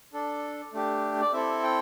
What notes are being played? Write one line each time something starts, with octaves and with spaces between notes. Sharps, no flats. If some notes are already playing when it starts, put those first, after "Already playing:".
D4 A4
A3 D4 G4
D5
C4 E4 A4 E5
G5